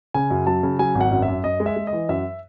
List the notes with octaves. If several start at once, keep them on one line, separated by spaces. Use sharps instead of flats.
C#3 G#5
F#2
F#3 A5
C#3
F#3 G#5
G#1
F#5
F#2
E5
F#2
F#2 D#5
G#3
E5
G#3
D#5
E3
F#2 E5